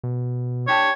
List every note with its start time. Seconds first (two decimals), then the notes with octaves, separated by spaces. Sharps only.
0.04 B2
0.68 D4 G4 C#5 A5